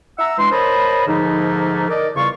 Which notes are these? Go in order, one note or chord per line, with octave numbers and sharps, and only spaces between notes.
E5 F#5 A#5 E6
E3 G#3 D4 C6
A#4 C5 C#5 D#5 A5 B5
G#2 D3 F3 A3 A#3 D#4
A#4 D5 D#5
E2 C#3 G3 F4 C#6